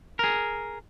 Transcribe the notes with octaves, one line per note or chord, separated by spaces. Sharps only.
G#4 A#4